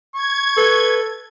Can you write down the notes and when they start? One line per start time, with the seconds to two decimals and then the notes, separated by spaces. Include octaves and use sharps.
0.15 C#6 G#6
0.57 A4 B4